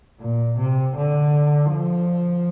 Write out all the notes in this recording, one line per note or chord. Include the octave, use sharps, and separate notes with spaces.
A#2
C3
D3
F3